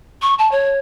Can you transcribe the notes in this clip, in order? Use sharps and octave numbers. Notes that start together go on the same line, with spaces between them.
C#6
A5
C#5